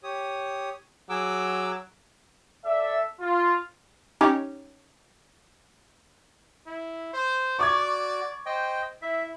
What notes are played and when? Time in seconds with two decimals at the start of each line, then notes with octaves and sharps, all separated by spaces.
0.03 G4 C#5 D#6
1.10 F#3 G#4 D6 E6
2.65 A4 D5 E5
3.20 F4
4.21 C#4 D#4 G4 C#5
6.67 E4
7.13 C5
7.59 F#4 D5 C#6 D6 G#6
8.46 C5 D#5 G5
9.02 E4 E5